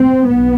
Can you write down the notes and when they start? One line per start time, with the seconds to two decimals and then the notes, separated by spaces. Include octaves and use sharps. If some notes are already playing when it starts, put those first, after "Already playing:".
Already playing: C4
0.26 B1 B3